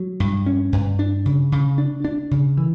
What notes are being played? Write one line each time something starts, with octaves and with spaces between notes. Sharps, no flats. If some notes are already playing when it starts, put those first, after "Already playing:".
Already playing: F#3
G2
C#4
G2
D4
C#3
C#3
D4
D4
C#3
E3